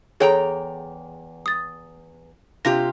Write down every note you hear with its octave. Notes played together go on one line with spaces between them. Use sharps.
E2 G#4 A4 C#5 G5 A#5
D#6 A6
C3 F4 G4 A#6